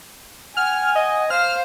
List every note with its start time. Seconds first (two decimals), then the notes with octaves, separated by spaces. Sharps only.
0.57 F#5 G#5 F6
0.95 D#5
1.30 C5 F5 F6